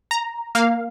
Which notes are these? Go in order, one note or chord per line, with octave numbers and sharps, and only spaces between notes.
A#5
A#3 F5